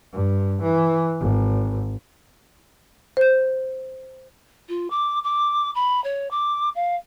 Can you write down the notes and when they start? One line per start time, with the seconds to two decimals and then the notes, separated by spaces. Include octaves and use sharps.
0.13 G2
0.62 E3
1.20 G#1
3.17 C5 G6
4.69 F4
4.90 D6
5.24 D6
5.75 B5
6.04 C#5
6.31 D6
6.75 F5